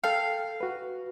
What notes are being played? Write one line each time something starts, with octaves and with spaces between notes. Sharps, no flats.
A4 F5 G5
F#4 B4